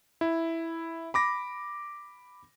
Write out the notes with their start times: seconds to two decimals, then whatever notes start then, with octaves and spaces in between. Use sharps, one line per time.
0.21 E4
1.14 B5 D6 A#6